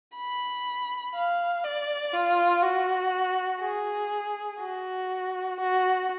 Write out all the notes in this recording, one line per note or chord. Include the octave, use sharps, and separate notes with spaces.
B5
F5
D5
F4
F#4
G#4
F#4
F#4